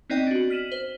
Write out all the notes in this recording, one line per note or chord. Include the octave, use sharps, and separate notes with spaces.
B3 C4 D#4 D5 D#5 G5
D4 F#4
F6 B6 D#7 E7 F#7
C5